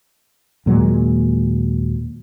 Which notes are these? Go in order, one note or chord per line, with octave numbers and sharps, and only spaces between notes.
D#2 A#2 F#3 G#3